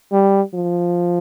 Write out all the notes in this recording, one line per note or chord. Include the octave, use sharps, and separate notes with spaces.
G3
F3